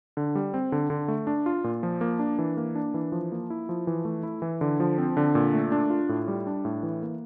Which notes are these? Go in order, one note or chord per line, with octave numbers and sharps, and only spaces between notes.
D3
G3
C4
D3
D3
A3
D4
F4
A#2
F3
A#3
D4
E3
A#3
D4
E3
F3
A#3
E4
F3
E3
A3
E4
E3
D3
F3
C4
D3
A#2
A3
D4
F4
A2
G3
D4
A2
E3
A#3